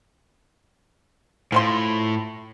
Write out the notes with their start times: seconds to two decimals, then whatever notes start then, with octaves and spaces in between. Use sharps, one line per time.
1.52 A2 F3 B4 C6